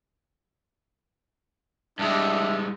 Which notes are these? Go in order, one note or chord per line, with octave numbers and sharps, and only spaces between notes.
G2 G#3 D4 G4 E5